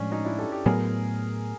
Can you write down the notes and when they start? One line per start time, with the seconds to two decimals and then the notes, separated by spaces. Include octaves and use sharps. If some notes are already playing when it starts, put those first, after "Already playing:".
Already playing: A2 F3 G#3 C#4 D4
0.12 C#4 D#4
0.25 D4 E4
0.38 G4 A4
0.52 G4 A4
0.66 A2 F#3 B3 G#4 A#4